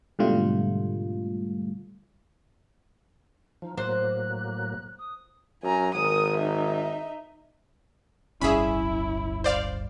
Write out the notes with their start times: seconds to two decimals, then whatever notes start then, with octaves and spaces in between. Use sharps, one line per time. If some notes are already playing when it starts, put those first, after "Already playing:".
0.19 G#2 B2 D3 G3 A3 F4
3.62 F3 D#4
3.78 A2 F#3 A#3 C5 F#6
4.99 D#6
5.63 F#2 G#5 A#5
5.95 G#1 A#4 D#6
6.37 D#4 E5
8.41 D1 G1 G3 C#4 E4 G#4 E5 B5
9.44 C5 D5 F5